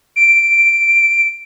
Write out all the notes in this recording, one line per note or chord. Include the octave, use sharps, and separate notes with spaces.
D7